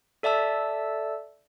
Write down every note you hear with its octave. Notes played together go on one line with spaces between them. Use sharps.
A4 D5 E5 A5 E6